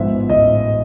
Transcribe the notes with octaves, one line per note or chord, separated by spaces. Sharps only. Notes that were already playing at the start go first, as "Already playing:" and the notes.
Already playing: A1 G#2 F3 G#3 B3 E5
A1 D#5